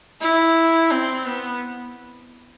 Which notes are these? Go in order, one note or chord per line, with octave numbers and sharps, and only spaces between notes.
E4
C4
B3